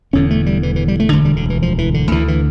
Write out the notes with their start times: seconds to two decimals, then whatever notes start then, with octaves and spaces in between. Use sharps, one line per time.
0.13 E1 E2 D3 C#4
0.30 A3
0.46 G3
0.63 E3
0.76 E3
0.88 G3
1.00 A3
1.13 E1 D2 D3 A3
1.25 G3
1.36 D3
1.50 E3
1.62 F3
1.78 E3
1.94 D3
2.11 D2 D3 E3
2.28 E3